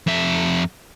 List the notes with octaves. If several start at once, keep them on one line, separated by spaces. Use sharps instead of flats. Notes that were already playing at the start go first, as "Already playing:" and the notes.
F2 E5